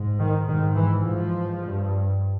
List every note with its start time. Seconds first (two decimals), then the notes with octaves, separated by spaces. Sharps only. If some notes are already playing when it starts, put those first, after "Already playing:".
Already playing: G#2
0.20 D#3
0.47 G#2 D#3
0.76 E3
1.04 G#2 F3
1.61 G2